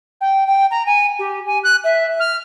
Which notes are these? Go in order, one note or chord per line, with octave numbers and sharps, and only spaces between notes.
G5
G5
A#5
G#5
G4
G#5
F#6
E5
F6